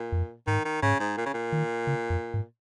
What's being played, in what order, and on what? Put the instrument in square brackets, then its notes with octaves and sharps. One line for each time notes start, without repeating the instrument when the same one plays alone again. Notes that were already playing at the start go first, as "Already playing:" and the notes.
Already playing: [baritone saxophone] A#2
[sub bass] F2
[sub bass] G#2 [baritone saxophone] D#3
[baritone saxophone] D#3
[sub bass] G#2 [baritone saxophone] C#3
[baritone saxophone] G#2
A#2
C#3
A#2
[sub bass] D#3
C#3
F2
G#2